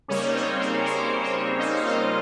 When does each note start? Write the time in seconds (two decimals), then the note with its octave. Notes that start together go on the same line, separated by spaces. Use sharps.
0.08 C#3 G3 A#3 C#4 D#4 C#5
0.34 C4 C5
0.59 A#3 A#4
0.85 C4 C5
1.21 C#4 C#5
1.59 D#4 D#5
1.75 D#5
1.84 F4 F5